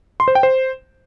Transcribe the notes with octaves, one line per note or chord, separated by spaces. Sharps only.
C6
C5
G5
C5